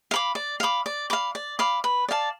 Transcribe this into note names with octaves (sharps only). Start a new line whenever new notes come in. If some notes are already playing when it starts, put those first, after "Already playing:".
F5 B5 D6
D5
F5 B5 D6
D5
F5 B5 D6
D5
F5 B5 D6
B4
D5 F5 A5